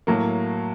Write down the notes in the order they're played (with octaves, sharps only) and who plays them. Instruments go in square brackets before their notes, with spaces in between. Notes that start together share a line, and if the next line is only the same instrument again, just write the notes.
[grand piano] A2 F#3 A#3